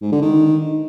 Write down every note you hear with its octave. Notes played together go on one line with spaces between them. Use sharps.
G#2
D3
D#3